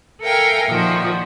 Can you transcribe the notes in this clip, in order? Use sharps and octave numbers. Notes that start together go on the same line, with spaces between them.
A4 A#4 E5 F5 G5 G#5
A#2 D#3 F3 F#4